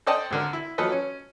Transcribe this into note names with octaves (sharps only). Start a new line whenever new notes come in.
A4 C5 D5 D#5 G5 A5
G#1 D3 A#4
E4
F3 F#3 A#3 A4 B4 D#5
C#4